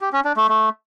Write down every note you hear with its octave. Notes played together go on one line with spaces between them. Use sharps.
G4
C#4
D4
A3
A3